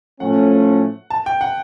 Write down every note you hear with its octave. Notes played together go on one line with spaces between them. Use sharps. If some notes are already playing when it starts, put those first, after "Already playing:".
A2 F3 A3 C#4 F#5
A5
G5
F#5